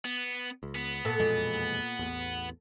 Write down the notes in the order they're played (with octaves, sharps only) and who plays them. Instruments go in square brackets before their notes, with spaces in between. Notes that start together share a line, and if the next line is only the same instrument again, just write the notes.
[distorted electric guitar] B3
[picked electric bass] C#2
[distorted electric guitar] B3
[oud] A#2 A4
[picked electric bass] E1 F2 G#3 [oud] A#2
[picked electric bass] A1 E2